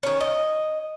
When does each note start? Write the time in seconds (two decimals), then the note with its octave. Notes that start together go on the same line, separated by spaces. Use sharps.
0.03 D#3 C#4
0.20 D#5